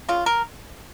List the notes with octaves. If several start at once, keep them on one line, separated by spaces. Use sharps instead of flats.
C#3 F4
A#4